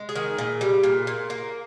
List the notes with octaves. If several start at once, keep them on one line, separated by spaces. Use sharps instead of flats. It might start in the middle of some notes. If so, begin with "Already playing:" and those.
Already playing: G#3
G#4
D#3
A#2
G3
A#2
A#2
A#3